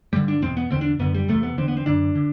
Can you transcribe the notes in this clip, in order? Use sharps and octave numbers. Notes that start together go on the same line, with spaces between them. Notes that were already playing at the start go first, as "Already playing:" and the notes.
G2 D3 G3
D4
E2 B2 C4
B3
E2 D3 C4
D4
F#2 D3 B3
G3
E2 C3 A3
B3
E2 D3 C4
B3
C4
F#2 D3 D4
D3